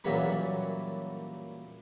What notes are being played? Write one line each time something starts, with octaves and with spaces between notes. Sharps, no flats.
F#2 A#2 E3 G3 C#4 B4